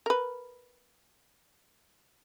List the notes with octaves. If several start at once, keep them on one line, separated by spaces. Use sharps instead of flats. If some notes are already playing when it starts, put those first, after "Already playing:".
A#4 B4